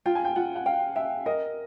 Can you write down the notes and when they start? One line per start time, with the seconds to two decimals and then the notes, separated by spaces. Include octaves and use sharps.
0.06 F4 G5
0.15 G#5
0.25 G5
0.36 F4 F#5
0.56 F#5
0.66 F5 G5
0.96 E5 G5
1.26 A#4 D#5